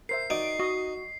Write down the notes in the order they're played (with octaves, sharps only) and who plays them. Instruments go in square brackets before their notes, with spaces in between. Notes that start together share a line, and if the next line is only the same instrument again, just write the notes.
[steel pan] A#4 C5 E5 [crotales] C7
[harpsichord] D#4 [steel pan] F#4 D5 [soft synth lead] D7
[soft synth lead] F#4 [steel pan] D#5